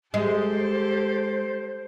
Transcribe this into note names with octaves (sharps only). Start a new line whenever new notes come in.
G#3 G4 A4 C5